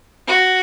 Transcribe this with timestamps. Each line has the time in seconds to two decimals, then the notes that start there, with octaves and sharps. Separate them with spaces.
0.27 F#4